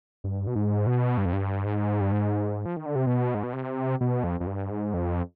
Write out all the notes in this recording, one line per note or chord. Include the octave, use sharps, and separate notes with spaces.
G2
B2
G#2
B2
G2
F2
G2
G#2
G2
G#2
F3
D#3
D3
C3
B2
G#2
B2
C3
B2
F2
F2
G2
G#2
F2